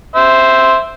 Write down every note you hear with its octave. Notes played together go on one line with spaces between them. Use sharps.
C5 E5